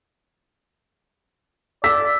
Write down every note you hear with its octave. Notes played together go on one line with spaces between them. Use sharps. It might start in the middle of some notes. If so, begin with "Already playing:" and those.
D5 E6 B6